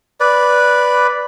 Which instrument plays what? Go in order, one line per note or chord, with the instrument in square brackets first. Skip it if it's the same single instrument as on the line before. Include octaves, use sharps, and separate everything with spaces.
[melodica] B4 D5